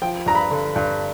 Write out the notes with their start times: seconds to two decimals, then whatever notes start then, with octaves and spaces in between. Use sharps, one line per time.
0.02 F3 G5
0.26 G2 A#5
0.35 B5
0.51 D3
0.76 G2